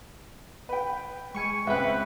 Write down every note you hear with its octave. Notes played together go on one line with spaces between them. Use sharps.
B4 G5
G#3 G#5 C#6 C#7
C#2 C4 B4 E5 F#5 G5